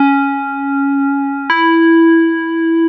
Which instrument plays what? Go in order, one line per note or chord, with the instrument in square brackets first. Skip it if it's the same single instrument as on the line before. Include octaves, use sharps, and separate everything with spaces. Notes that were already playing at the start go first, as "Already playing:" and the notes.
Already playing: [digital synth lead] C#4
E4